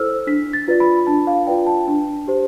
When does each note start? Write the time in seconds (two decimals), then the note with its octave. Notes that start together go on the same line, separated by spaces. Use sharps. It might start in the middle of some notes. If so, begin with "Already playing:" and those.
Already playing: E4 A4 C5 E6 F6
0.27 D4 B6
0.53 A6
0.68 F4 B4 D5
0.80 B5
1.07 D4 A5
1.27 F5
1.47 F4 B4 D5 G5
1.67 A5
1.88 D4
2.27 G4 C5